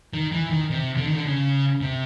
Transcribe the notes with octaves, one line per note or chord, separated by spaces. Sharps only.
D#3
E3
D#3
C3
D3
D#3
D3
C#3
C3